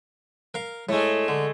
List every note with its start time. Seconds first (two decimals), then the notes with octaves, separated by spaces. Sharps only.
0.54 A#4 F5
0.89 A2 G#3 A3
1.28 D3